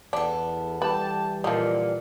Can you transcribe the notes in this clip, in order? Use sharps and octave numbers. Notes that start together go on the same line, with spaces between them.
E2 B3 D4 A4
E3 G3 B4 D5 G5 A5
A#2 D3 F3 D#4